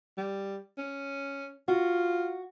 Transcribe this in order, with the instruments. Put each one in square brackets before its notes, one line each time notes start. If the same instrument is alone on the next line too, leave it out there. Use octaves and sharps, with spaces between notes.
[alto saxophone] G3
C#4
[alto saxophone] F4 [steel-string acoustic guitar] F#4